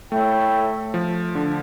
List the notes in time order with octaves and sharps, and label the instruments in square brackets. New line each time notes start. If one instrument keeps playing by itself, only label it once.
[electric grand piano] A3 [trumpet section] E4 A4 C#5 E5 G5
[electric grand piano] F3
D3